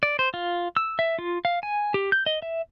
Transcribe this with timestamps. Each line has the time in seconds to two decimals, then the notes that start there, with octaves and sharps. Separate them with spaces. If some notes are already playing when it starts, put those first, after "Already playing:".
0.03 D5
0.19 C5
0.34 F4
0.77 E6
0.99 E5
1.19 F4
1.45 F5
1.63 G#5
1.94 G4
2.12 G6
2.26 D#5
2.42 E5